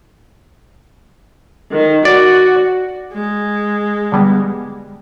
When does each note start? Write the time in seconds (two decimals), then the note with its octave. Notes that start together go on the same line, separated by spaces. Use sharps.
1.71 D#3
2.05 F#4 D5
3.13 G#3
4.12 D3 G3 B3